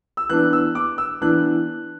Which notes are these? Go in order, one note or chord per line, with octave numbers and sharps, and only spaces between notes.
E6
E3 B3 D4 F#6
E6
D6
E6
E3 B3 D4 F#6